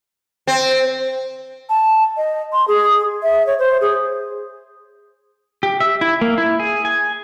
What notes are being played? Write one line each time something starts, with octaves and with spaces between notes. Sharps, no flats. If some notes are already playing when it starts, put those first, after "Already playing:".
C4
A5
D#5
C6
G#4
E5
C#5
C5
G#4
G4
E5
E4
A#3
E4
G#4
G#5